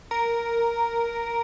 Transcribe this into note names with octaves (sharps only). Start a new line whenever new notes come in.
A#4